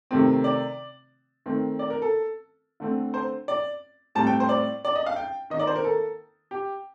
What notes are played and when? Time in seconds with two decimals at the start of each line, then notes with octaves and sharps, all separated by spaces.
0.11 C3 D#3 A3 C4
0.44 D5
1.46 D#3 A3 C4
1.79 D5
1.90 A#4
2.02 A4
2.80 D3 A3 C4
3.14 C5
3.48 D5
4.15 A2 G3 C4 A5
4.27 G5
4.40 C5
4.49 D5
4.85 D5
4.95 D#5
5.06 F5
5.16 G5
5.50 D#3 A#3 D#5
5.59 D5
5.67 C5
5.76 A#4
5.84 A4
6.51 G4